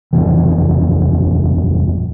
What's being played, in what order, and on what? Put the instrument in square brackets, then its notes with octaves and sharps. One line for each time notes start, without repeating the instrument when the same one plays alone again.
[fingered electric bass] D#1 A1 F2 E3